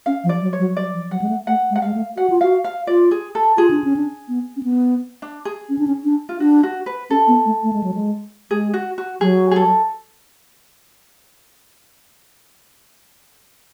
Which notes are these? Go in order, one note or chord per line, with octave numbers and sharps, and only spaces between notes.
C#4 F5
F3
D5
F#3
C#5
F#3
F#3 D5
F3
F#3 F#5
G#3
A3
A3 F#5
G#3
F#5
G#3 F5
A3
F#4 F#5
F4
F#4 F5
F5
F4 D5
G#4
A4
F4 G#4
D4
C#4
D4
B3
C#4
B3
D4
G#4
C#4
D4
C#4
D4
F4
D4 F#4
F#4
B4
C#4 A4
B3
A3
A3
G#3
F#3
G#3
G#3 G#4
F#4
F#4
F#3 G#4
G#4
A4